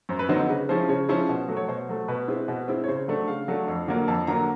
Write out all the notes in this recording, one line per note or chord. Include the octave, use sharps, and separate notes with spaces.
F#2 C5
B4
D3 F#3 B3 D#4 C5
C#3 B4
F3 G#3 C#4 E4 C5
C#3 C#5
F3 G#3 C#4 E4 C5
B2
F#3 A3
C#5
B2 C5
F#3 A3
B2 B4
G#3 C4 E4
B2
G#3 C4 E4
C#5
C#3 C5
F#3 A3 D4
C#3 F5
F#3 A3 D4
F2
D3 F#3 A#3
F2 A5
D3 F#3 A#3 A#5